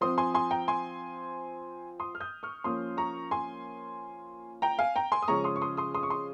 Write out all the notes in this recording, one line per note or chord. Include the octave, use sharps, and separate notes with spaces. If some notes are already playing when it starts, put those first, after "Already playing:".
F3 C4 C6 D#6
G#5 C6
G#5 C6
G5 A#5
G#5 C6
C6 D#6
F6
D#6 G6
C#6 F6
F3 A#3 C#4 C6 D#6
A#5 C#6
G#5 C6
G5 A#5
F5 G#5
G5 A#5
G#5 C6
D#6
C#3 F3 G#3 C#4 A#5 C#6
C6 D#6
C#6
C6 D#6
C6 D#6
C6 D#6
C#6
C6 D#6